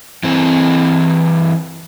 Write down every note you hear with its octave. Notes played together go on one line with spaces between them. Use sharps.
E3 C4